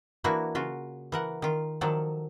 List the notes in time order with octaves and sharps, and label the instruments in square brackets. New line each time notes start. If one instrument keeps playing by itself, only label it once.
[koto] E3 A#3 D4 E4 F#4
C#3 F4 F#4
E3 A#4 F#5
D#3 F4
D#3 F3 F#3 A4 D5